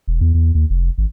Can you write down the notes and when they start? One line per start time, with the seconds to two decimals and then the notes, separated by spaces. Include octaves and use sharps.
0.08 E1
0.21 E2
0.34 E2
0.55 D#2
0.70 F1
0.98 G#1